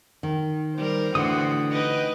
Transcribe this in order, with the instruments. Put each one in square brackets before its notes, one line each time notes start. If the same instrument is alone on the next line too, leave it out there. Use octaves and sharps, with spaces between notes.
[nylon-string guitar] D#3
[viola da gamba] G3 A#4 [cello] C5
[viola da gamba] A2 E3 F#4 [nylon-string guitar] D3 [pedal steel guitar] F#5 D#6
[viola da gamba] D#4 B4 [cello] D#5 G5